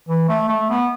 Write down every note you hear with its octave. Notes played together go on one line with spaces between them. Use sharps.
E3
A3
A3
B3